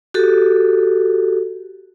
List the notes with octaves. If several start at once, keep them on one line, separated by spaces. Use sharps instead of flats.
F#4 G4 A4